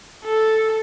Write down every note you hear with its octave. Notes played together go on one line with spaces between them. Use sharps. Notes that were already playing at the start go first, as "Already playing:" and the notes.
A4